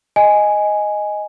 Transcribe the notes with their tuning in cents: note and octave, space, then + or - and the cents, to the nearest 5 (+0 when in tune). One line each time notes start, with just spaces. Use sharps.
D#5 +0 G#5 +0